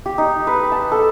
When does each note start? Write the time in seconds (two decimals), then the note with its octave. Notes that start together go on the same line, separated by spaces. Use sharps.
0.06 G4
0.18 D#4
0.47 B4
0.72 A5
0.92 A4